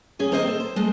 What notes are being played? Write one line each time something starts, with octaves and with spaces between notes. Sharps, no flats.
C#4 G#4 G#5
D#3 A#3 C4 C5 C#5 D#5
A4
C5
G#3 A3